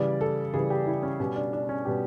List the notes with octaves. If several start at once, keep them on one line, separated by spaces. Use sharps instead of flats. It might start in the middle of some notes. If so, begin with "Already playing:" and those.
Already playing: C#3 E3 G3 D5
A4
C#3 E3 G3 G#4
G4
E4
C#4
B2 G3 C#4
D4
D4
C#4
B2 G3 G4